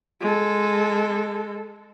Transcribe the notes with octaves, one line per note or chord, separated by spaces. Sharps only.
G#3 A4